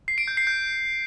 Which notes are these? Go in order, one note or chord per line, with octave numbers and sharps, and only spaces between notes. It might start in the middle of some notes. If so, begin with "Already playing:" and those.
C7
D7
G6
C7
G6